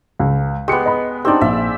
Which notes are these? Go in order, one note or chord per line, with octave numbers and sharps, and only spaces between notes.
C#2
G#3 B3 G4 C#7
D#5 B5
C4 D4 D#4 G4 D5
A#1 E5